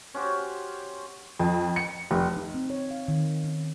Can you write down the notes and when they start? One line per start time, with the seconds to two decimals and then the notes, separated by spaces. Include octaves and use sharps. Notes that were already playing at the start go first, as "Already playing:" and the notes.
0.14 C#4 F#4 G4 C5
1.40 F2
1.76 C#7
2.11 F1
2.37 D#4
2.54 C4
2.70 C#5
2.91 F5
3.08 D#3
3.44 C#4